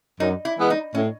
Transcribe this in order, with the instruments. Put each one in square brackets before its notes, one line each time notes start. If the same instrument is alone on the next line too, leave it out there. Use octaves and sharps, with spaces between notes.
[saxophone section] F#2 [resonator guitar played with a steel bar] D#4
[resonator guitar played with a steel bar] E4
[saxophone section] E3 G#3 B3
[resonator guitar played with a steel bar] D#4
[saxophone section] A2 [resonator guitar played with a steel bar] C#4